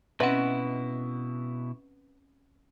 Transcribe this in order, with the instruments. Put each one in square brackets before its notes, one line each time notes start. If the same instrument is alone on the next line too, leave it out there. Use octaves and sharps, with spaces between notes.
[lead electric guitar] B2 E4 [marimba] C4 C#4 [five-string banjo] B4 [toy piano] D#5 E5 F#5